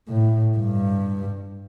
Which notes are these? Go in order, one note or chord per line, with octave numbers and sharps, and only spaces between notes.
A2
G2